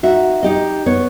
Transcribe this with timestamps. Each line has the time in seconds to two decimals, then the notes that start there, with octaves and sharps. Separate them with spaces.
0.03 D#4 F#4 E5
0.43 D#4 G4 D#5
0.86 B3 C#5